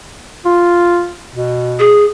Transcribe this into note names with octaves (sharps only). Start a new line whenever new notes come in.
F4
B2
G#4